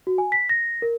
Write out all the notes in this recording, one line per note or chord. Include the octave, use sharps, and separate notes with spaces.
F#4
G#5
B6
A#6
A#4